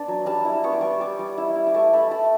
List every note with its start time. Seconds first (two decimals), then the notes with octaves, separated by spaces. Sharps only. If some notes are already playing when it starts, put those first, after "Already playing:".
Already playing: B3 D4 A5
0.08 F#3
0.26 G3 A5
0.45 E4
0.64 B3 C#6
0.73 D6
0.81 G3 C#6
1.00 G3 D6
1.19 G3
1.37 E4
1.56 E4
1.67 D6
1.74 A3 C#6
1.93 A3 B5
2.11 A3 A5